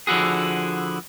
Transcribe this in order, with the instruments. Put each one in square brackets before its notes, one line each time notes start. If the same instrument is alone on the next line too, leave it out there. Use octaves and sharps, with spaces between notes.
[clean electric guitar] D3 F3 E4 F#4 G#4